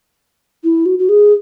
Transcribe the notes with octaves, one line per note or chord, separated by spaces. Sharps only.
E4
F#4
F#4
G#4